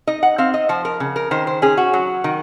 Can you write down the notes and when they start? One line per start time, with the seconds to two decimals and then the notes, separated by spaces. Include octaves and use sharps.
0.07 D#4 D#5
0.23 F#5
0.38 C4 F5
0.54 D#5
0.69 F3 C5
0.85 A#4
1.00 C#3
1.16 A#4
1.31 D#3 C5
1.47 C5
1.62 C#4 G#4
1.77 F#4
1.93 F#3
2.24 D#3